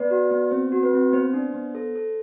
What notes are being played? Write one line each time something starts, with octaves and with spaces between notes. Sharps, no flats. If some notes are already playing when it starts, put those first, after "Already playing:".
Already playing: B3 B4 D5
F#4
B3
C4 C5
F#4
B4
C4
B3 C5
D4
B3
A4
A4